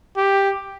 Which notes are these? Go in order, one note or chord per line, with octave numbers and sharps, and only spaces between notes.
G4